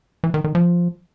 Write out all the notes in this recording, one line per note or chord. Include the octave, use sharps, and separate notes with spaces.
E3
D#3
D#3
F3